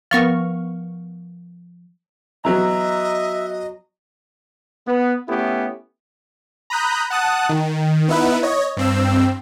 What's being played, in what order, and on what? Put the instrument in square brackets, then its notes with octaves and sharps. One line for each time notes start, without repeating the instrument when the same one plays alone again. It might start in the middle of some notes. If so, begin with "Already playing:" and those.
[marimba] F3 A#4 [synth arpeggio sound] B3 C#6 F6
[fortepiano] E3 F#3 B3 [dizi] D#5 [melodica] E5 [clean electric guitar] A#5
[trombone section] B3
A3 B3 C#4 E4 G4
[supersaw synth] A#5 B5 D#6 F#6 G6
F#5 A5 D#6 F#6
D#3
B3 D#4 E4 B4
C#5 D#5
G2 C4 E6